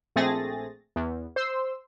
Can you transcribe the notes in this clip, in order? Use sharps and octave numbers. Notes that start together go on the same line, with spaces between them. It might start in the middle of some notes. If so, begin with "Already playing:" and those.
A#1 A3 C4 G#4 A6 A#6
E2
C5 C6 E6